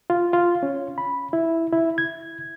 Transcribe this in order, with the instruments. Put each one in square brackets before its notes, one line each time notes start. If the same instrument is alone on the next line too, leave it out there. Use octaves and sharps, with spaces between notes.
[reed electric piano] F4
F4
C#4
B5
E4
E4
G#6